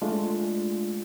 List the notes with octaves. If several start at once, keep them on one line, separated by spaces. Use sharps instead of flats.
G#3 A3 D4 F4